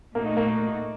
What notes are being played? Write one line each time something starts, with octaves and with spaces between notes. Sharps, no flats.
A#2 A3 A#3 D#4 F#4
A#3